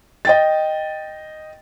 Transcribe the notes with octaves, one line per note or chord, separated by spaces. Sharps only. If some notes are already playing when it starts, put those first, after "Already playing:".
D#5 G5 A6